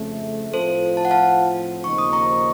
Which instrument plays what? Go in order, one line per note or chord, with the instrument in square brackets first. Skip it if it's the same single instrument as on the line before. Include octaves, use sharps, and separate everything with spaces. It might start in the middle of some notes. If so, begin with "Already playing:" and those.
Already playing: [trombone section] F2 C#3 A3
[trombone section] A2 F3 C4 F4 [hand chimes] A4 C5
[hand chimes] A5
F#5
F5 A5
[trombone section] D#2 C#3 F3 C4 D#4 [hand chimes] C#6
[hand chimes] D#6
A#5 C#6